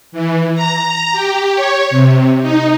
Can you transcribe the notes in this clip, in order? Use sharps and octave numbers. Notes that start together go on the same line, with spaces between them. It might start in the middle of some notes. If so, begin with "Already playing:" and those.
E3
A#5
G4
C#5
C3
D#4